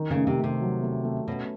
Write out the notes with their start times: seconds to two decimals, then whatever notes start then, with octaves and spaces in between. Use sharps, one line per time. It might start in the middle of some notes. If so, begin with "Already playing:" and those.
Already playing: D#3
0.10 C#3 A3
0.27 C3
0.38 A3
0.44 C3
0.61 F#3
0.82 A3
1.05 A3
1.28 B2 C#4